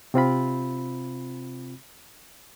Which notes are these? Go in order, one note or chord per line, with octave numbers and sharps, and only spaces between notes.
C3 C4 F4 B5